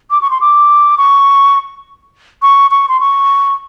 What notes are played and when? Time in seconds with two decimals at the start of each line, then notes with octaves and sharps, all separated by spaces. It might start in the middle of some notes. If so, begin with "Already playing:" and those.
0.11 D6
0.22 C#6
0.31 C6
0.41 D6
0.98 C#6
2.42 C#6
2.71 C#6
2.89 C6
3.00 C#6